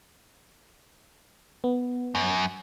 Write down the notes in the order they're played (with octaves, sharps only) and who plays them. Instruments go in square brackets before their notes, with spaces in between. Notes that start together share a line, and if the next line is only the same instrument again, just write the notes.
[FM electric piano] B3
[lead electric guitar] F#2